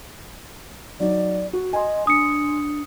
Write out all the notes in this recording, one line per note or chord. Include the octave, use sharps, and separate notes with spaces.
F#3 D#4 D5
F#4
D#5 G#5 C6
D4 D#6 C#7